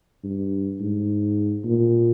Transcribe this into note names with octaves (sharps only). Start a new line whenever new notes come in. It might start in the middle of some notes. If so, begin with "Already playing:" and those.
G2
G#2
A#2